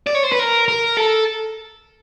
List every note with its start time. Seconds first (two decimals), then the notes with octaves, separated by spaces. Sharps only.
0.07 D5
0.15 C#5
0.24 C5
0.32 B4
0.39 A#4
0.68 A#4
0.97 A4